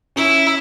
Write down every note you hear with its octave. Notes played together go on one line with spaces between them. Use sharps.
C#4 E4